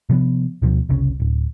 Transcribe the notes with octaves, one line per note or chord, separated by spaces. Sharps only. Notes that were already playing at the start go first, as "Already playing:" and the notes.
C3 F3 A3 B3
D2 B2 F3
F1 C2 C#3
D1